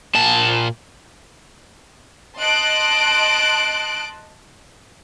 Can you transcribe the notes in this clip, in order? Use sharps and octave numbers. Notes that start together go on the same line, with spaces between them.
A#2 A5
D#5 A5 C6 F#6 D7